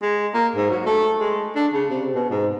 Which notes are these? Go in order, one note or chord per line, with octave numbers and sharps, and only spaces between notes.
G#3
A#3
G#2
F#3
A3
G#3
D4
C#3
C3
B2
G#2